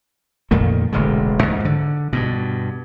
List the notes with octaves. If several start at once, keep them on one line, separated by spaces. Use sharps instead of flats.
F2 A#2 D#3 A3
E1 A1 D3 G#3
D2 G#2
D3
G2 B2